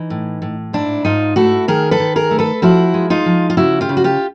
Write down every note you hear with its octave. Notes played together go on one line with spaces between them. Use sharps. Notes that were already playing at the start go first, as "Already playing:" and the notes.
Already playing: E3 D#4
A2
A2
G#2 D4 E4
G#2 D#4 F4
A3 E4 F#4
D#3 G#4 A#4
A4 B4
D#3
G#4 A#4
A3
A4 B4
F3 E4 F#4
G#3
D#4 F4
F3
F4
C#3 E4 F#4
F4 G4
C#3
F#4
F4 G4